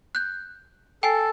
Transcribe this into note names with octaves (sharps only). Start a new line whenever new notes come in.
F#6 G6
A4 G5 G#5 C7